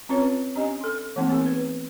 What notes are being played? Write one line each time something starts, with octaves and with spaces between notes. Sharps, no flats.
C4 C#4 F4 B4 C#5
C#4 D4 G4 D#5 G#5
A4 C6
E3 A3 A#3 C4 D#4
B3 C4 G#4 A#4
B4